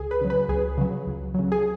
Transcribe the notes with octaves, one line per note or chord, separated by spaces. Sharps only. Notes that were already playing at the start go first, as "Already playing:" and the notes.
Already playing: C#2 G#4
B4
C#3 F#3
B4
C#2 G#4
C#3 F#3
C#2
C#3 F#3
G#4